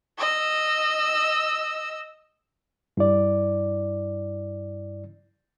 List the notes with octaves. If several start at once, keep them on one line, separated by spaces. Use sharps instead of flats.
D#5 E6
G2 E4 D5